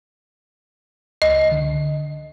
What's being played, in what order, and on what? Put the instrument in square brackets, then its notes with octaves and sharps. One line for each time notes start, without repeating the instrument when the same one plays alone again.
[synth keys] C#2 [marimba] D#5
[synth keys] D3